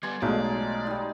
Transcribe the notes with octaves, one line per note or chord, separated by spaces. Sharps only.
G3 B3 D5 G#5 C6
B1 G#3 A3 D#4 F4 D5
G3 D#4